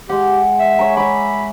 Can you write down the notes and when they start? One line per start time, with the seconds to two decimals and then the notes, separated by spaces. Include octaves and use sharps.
0.09 G#3 G4 F#5
0.60 E5
0.79 C#5 G#5 A#5
0.97 E5 B5 D6